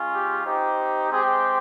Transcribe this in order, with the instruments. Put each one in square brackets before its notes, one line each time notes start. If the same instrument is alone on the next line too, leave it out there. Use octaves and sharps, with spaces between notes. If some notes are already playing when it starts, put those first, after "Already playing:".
Already playing: [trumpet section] G#3 C#4 F4
G4
C4 D#4 G4
G#3 C4 G4 G#4